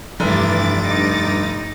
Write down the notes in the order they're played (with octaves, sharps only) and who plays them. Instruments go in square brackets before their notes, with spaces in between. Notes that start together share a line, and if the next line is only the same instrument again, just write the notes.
[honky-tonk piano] F1 [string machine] G2 D6 A6 [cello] E3
[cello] D#4